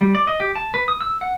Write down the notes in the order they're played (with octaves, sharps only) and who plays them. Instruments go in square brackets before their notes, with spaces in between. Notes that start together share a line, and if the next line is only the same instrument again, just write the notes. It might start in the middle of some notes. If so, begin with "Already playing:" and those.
[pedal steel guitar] G3
D5
D#5
G4
A5
B4
D#6
E6
F#5